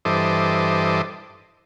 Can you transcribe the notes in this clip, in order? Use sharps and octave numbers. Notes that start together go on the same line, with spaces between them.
G2 E3 A4 C5 D#5 D6